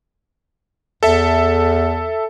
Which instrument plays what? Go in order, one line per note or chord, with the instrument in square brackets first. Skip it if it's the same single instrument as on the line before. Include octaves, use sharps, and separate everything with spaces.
[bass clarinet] E2 [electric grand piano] A4 E5